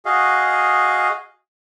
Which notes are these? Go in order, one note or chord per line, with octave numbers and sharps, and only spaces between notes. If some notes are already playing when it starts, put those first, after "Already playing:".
F#4 G#4 D#5 F5